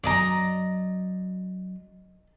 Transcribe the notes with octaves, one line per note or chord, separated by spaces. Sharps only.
F#2 F#3 D5 D#5 A#5